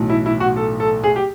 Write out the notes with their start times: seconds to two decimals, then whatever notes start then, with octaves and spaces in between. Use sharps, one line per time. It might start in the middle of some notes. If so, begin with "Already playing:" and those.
Already playing: B1 A2 E3
0.10 E4
0.26 E4
0.40 F#4
0.56 A4
0.80 A4
1.04 G#4
1.16 G4